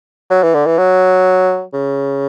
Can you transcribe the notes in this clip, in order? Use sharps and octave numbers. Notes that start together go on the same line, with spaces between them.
F#3
E3
D3
E3
F#3
C#3